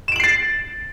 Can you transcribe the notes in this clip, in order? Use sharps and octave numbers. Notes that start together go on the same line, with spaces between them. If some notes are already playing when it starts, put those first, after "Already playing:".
A6 C7 D7 E7 F#7